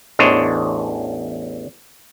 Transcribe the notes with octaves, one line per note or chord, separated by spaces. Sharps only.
A1 E2 D4 C5 C#5 D#5